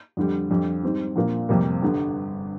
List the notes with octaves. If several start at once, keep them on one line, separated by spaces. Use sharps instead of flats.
F2 D3 G3
F2 D3 G3
G#2 G3 C4 D#4
A#1 A#2 F3 A#3
F2 C3 G3 A#3
G1 G2 D3